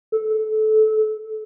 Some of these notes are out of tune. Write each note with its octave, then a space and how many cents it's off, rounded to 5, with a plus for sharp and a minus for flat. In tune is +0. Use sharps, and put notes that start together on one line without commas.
A4 -20